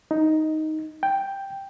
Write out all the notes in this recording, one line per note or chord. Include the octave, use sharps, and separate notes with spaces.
D#4
G5